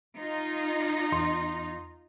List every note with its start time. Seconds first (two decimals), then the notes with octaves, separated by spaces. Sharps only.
0.17 D#4 F4
1.12 E2 C6